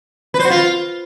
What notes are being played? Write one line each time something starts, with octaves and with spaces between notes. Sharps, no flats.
B4
C5
F#4
F4